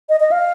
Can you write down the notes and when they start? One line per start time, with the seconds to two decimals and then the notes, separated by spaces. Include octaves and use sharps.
0.09 D#5
0.20 D#5
0.31 F5